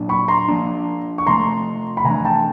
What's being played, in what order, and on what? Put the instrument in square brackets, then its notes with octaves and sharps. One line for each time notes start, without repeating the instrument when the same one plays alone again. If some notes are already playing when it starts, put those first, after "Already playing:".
Already playing: [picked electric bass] A#2 F#3 A#3 D4
[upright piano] B5 C#6
A#5 C6
[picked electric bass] F3 A#3 D4
[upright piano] C#6
[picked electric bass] C3 F3 A3 [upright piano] A#5 C6
[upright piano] B5
[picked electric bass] C3 E3 A3 D4 [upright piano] G#5 A#5
[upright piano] G5 A5